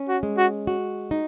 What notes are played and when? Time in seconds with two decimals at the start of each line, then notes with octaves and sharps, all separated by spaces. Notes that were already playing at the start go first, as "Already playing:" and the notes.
Already playing: C#4
0.08 F#4
0.23 G#3
0.38 F#4
0.67 F#4
1.11 D#4